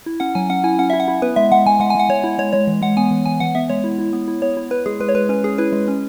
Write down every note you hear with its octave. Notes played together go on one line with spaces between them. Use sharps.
E4
C#4 F#5
F#3 G#5
C#4 F#5
E4 G#5
C#4 F#5
E4 E5
F#5
E4
B3 B4
G#3 E5
G#3 F#5
G#3 G#5
G#3 F#5
G#5
G#3 F#5
G#3 C#5
E4
G#3 C#5
G#3 C#5
E3
G#3 F#5
B3 G#5
E3
E3 G#5
E3 F#5
B3 E5
G#3 C#5
E4
E4
B3
E4
B3 C#5
E4
E4 B4
G#3 G#4
G#3 B4
C#5
G#3 B4
C#4 B4
C#4 G#4
E4 B4
G#3
C#4